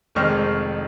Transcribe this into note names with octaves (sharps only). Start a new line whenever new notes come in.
F1 F2 D#3 G#3 C4 C#6 F6